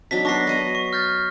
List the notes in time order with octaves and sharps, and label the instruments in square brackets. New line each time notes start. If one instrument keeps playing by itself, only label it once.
[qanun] F#3 D4 D#4 [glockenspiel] B6
[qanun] B3 D4 [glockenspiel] C#6 A#6 C7
[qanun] B3 D#5 A#5
[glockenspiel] C#6
F6 G6 A6